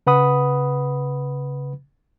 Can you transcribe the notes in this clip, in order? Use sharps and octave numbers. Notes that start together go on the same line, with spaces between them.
C#3 B4 F#5 B5 D#6